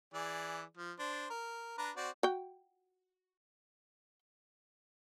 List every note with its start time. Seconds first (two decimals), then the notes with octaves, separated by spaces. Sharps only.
0.14 E3 G#4 D5
0.77 F3
0.99 D4 C5
1.30 A#4
1.78 D4 B4 A#5
1.96 C4 F#4 D5
2.23 F#4 G5